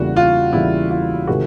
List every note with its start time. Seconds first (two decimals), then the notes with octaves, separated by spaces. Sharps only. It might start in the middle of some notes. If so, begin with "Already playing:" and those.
Already playing: E2 C#3 E3 G3 A#3 F#4
0.16 F4
0.53 E2 C#3 E3 G3 A#3 E4
0.90 F4
1.27 C3 D#3 G#3 F#4